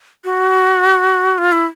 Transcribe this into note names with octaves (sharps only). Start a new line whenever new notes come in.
F#4
F4
E4